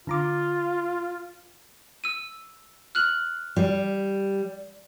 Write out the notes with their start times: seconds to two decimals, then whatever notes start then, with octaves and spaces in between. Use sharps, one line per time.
0.07 D3 F4 A#5 D6
2.04 E6 D#7
2.95 F6 F#6 F#7
3.56 G3